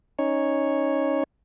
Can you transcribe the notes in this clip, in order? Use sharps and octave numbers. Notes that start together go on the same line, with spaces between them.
C#4 D#4 C#5